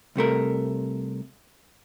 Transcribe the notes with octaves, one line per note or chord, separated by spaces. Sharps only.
C2 C3 A3 A#4